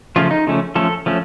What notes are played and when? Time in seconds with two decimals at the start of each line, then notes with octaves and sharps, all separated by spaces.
0.16 C#3 F3 A3 C#4 F4
0.31 D#4
0.47 C#3 F3 A3 C#4
0.75 F3 A3 C#4 A4
1.06 F3 A3 C#4